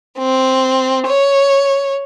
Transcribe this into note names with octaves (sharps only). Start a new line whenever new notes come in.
C4
C#5